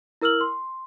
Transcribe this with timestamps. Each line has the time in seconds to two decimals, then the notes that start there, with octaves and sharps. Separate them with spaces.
0.21 E4 A#4 E6 F6 F#7
0.41 C6